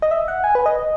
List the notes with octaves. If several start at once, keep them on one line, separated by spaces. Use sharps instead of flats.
D#5
E5
F#5
G#5
B4
D#5